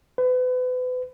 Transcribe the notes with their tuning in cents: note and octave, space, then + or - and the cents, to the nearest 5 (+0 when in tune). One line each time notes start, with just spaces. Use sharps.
B4 +35